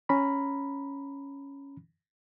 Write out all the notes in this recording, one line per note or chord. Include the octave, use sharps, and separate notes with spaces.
C#4 A#5 B5